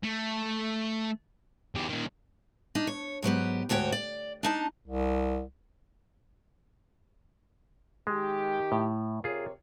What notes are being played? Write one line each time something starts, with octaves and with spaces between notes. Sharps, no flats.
A3
E2 G4
A#2 D#3
D4 D#4
C#5
G#2 F#3 B3 G4
D2 G#2 F#4 C#5 G5
D5
D4 D#4 A5
C2
D#3 G#3 G4
A2
C3 F4 G#4 A#4 C#5